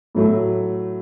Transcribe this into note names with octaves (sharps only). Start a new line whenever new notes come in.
A2 F#3 A3